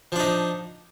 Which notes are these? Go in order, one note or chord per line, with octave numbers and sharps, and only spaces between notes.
F3 D4 D#4